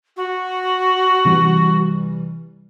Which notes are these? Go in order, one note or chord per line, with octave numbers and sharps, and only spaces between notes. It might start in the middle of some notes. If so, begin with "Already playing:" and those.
F#4
C3 E3 G3